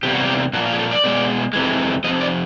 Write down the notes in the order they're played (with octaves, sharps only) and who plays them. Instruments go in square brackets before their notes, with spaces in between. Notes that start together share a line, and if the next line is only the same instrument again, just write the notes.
[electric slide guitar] E2 C3 G3 A#3 G4
F#4
G4
A#2 F3 A#3 F#4
F4
G#4
A4
D5
B2 G#3
F2 C3 E3 G#3
F2 C3 F3 D#5
D5